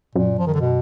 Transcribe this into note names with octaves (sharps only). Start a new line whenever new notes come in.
F#2 A#2
F3
D#3
D3
B2